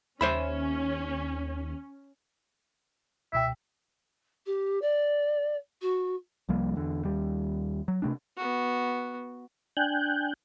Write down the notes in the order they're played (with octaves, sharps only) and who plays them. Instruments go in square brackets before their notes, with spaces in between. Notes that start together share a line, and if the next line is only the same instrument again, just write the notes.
[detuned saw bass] D#2 [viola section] C#4 [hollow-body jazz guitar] C5 E5 B5
[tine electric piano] C#2 B2 G5 [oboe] E5
[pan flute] G4
D5
F#4
[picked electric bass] C2 F3 G3 A#3
E2 D3
D#2 G3
F#3
C3 A3 D4
[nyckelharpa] B3 F#4
[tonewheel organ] D4 G5 G#5 F#6 G6